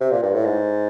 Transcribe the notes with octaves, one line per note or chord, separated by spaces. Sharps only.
C3
A#2
G2
A2
G#2